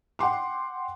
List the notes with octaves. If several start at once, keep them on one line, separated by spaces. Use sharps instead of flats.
F#5 G5 C6 D6